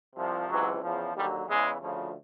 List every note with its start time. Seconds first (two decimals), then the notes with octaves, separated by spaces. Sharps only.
0.15 C2 C3 F3
0.48 C#2 C3 E3 F#3
0.82 E2 C#3 F3
1.14 D#2 D3 F#3 G3
1.47 E2 C#3 E3 G#3
1.80 D2 C#3 F3